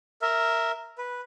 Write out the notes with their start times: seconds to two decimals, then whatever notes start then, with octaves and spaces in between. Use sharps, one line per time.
0.22 A#4 E5
0.98 B4